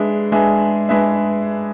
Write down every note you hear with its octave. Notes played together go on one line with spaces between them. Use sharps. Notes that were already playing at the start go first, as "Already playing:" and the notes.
Already playing: G#3 D4 G#4 B4 E5
G#3 D4 G#4 B4 E5
G#3 D4 G#4 B4 E5